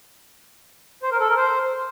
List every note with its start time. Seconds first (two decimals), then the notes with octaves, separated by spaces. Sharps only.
1.03 C5
1.11 A#4
1.20 A4
1.28 A#4
1.37 C5